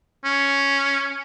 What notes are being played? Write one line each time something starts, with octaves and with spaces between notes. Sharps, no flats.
C#4